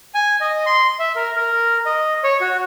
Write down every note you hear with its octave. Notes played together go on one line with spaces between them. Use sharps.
G#5
D#5
C6
E5
A#4
A#4
D#5
C#5
F#4